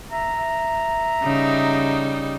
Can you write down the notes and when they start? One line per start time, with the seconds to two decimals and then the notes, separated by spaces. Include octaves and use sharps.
0.11 E5 A#5
1.22 C#3 G3 D#4